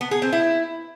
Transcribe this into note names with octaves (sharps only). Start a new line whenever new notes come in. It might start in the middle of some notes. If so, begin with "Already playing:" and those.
B3
G#4
C4
E4